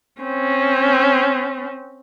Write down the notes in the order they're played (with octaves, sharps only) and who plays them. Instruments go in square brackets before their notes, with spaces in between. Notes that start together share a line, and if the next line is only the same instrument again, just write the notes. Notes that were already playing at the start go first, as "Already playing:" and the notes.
[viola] C4 C#4